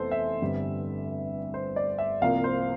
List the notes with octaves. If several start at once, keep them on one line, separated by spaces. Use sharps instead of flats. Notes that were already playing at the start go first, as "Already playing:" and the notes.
Already playing: F1 E2 A4 C5
E5
G1 G2 D3 G3 C4
C5
D5
E5
C2 C3 F3 A#3 F5
C5